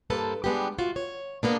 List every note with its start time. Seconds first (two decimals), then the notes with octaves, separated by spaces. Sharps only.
0.10 G2 A#3 A4 B4 C5 A5
0.44 G3 G#3 B3 D4 G4
0.79 F4 F#4
0.96 C#5
1.43 G#3 A#3 B3 D4